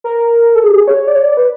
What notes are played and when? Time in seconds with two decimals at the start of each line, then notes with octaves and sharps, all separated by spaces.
0.04 A#4
0.55 A4
0.64 G#4
0.70 G4
0.76 G#4
0.88 C#5
1.07 D5
1.15 C#5
1.23 D5
1.37 B4